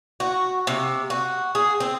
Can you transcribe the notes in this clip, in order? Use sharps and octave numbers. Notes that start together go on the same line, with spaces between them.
F#4
C3
F#4
G#4
C4